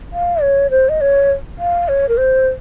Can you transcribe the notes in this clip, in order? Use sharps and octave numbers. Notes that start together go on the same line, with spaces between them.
F5
C#5
C5
D#5
C#5
F5
C#5
A#4
C5